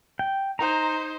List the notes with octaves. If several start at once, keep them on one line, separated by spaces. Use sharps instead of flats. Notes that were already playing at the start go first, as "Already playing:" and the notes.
G5
D#4 C5 A#5